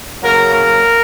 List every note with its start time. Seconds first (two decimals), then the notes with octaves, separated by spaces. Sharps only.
0.23 C#3 F#3 A#3 A#4
0.52 A#4